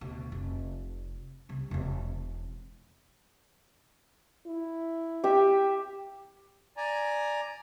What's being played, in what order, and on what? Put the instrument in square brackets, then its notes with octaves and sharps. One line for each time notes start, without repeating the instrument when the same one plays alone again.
[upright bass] D2 B2
F1
C2 C3
E1 C4
[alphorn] E4
[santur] G4 E5
[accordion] D5 G#5 A#5